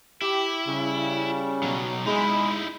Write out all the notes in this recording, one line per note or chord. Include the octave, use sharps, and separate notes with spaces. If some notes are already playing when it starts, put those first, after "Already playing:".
E4 G4
C#3 G3
B2 F#3
G#3 D#4 E4 B5